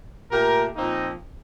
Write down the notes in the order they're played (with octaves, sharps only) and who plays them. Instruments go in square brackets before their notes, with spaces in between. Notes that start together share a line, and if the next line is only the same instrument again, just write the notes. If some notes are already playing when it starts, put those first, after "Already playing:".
[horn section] A#2 A3 G4 A#4
A#2 F3 A#3 C4 D#4